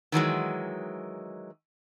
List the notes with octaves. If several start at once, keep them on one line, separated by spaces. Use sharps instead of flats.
D#3 E3 F#3 G#3